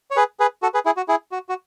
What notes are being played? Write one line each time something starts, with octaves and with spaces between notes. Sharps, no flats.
C#5
G#4 B4
G#4 B4
F#4 A4
G#4 B4
E4 G#4
F#4
E4 G#4
F#4
F#4